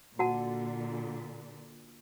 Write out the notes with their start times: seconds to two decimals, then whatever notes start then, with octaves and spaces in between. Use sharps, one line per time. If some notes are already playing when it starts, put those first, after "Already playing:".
0.19 A#2 D3 F#4 F#5 A5